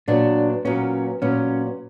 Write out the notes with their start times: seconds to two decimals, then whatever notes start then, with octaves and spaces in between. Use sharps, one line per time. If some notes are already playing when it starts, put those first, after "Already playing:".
0.08 A#2 F#3 B3 D4
0.65 A#2 F#3 B3 C#4
1.22 A#2 F#3 B3 C#4